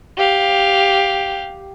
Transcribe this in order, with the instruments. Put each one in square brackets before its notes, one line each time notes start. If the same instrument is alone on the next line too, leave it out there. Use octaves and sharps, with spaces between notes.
[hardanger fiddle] G4 F5